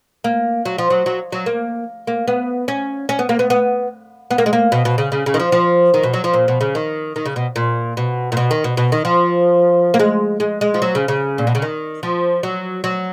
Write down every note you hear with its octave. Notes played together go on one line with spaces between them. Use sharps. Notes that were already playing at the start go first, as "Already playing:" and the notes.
A#3
F#3
F3
F#3
F#3
F#3
A#3
A#3
B3
C#4
C#4
B3
A#3
B3
B3
B3
A#3
G#3
A#3
B2
B2
C#3
C#3
C#3
D#3
F3
F3
D#3
B2
F#3
F3
A#2
B2
C#3
D#3
D#3
C#3
B2
A#2
B2
A#2
B2
D#3
B2
B2
D#3
F3
A#3
G#3
G#3
G#3
F3
F#3
C#3
C#3
A#2
B2
C#3
D#3
F3
F#3
F#3